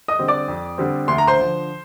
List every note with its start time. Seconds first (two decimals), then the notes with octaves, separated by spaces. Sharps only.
0.08 D#5 D#6
0.19 D3 G3 C4
0.28 D5 D6
0.48 F2
0.78 D3 G3 C4
1.08 D2 C6
1.18 A#5
1.28 C5 C6
1.39 D3 F3